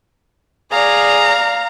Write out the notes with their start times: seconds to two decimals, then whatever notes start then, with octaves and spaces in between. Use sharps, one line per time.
0.72 G#4 D5 F5 A#5